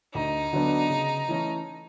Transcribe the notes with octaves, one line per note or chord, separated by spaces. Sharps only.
D2 D#4
D3 F#3 B3 D4
C#3
E3 A3 C#4